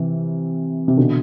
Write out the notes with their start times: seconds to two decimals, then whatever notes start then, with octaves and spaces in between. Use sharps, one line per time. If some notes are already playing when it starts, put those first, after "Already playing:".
Already playing: C3 E3
0.88 C3
0.97 B2 D3